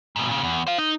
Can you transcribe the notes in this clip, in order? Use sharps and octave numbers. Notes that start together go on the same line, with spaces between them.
G#2 B2
A#2 C#3
E2
C5 F5
D#4